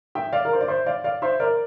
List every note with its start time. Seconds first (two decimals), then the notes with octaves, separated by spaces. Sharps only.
0.15 E5 G5
0.32 D5 F5
0.45 A#4
0.53 C5
0.61 D5
0.68 C5 E5
0.86 D5 F5
1.04 D5 F5
1.22 C5 E5
1.40 A#4 D5